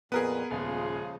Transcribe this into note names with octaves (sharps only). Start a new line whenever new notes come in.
F2 A#2 B3 G#4 A#4 B4
D#1 C#3 F3 G#3 F4 G#4